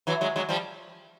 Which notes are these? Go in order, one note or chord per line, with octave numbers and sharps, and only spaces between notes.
E3 F#3
F#3 G#3
F#3 G#3
F3 G3